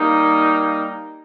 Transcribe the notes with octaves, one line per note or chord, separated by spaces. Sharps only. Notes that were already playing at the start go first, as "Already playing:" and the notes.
Already playing: G3 A#3 D#4